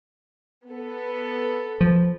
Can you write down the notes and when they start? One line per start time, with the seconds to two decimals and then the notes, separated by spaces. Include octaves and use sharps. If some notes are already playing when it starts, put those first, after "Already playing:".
0.71 B3 A4
1.81 F3